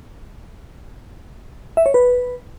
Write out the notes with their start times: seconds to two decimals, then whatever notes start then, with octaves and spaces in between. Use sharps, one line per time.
1.77 E5
1.86 C#5
1.94 B4